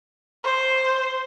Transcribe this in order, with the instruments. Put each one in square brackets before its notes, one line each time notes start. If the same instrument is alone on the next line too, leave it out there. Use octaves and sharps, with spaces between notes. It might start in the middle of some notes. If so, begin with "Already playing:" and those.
[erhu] C5